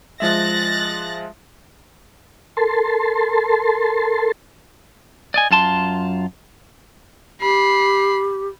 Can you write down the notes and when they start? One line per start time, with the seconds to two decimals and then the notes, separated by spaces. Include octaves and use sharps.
0.20 F3 G#3 E5 F#6 A6 A#6
2.57 A4 A#4 A5 C6
5.34 D5 D#5 G#5
5.51 F#2 F4 A5 C6
7.41 G4 B5 C7